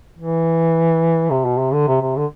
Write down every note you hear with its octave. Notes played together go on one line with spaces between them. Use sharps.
E3
C3
B2
C3
D3
C3
C3
D3